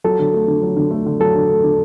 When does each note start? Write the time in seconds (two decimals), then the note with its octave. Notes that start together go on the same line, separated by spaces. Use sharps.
0.04 F#3 A4
0.19 D3
0.34 A3
0.48 D3
0.63 F#3
0.77 D3
0.91 A3
1.06 D3
1.20 F#3 A4
1.35 D3
1.49 A3
1.64 D3